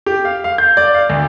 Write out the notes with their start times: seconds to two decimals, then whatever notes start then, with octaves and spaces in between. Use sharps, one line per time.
0.06 G4
0.25 F5
0.44 F5
0.58 G6
0.77 D5
0.94 F5
1.10 D2